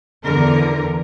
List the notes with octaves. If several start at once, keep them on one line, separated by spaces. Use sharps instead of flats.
E2 D3 A#4